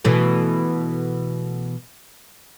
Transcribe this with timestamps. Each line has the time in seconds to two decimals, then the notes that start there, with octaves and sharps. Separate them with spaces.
0.05 B2 E3 A3